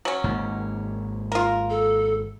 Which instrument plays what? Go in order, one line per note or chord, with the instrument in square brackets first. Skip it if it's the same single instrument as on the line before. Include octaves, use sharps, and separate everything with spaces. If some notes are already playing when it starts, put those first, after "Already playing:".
[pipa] F#3 C#4
[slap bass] G#1 G#2 A#3
[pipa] F4 A#4
[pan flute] A4